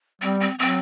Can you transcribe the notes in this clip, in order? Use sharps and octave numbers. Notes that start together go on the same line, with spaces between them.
G3 C4
C4
F#3 C4